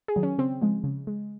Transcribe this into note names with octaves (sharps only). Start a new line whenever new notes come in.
G#4
D#3 F#3
C#4
C#3 C4
F3 G#3
C#3
G#3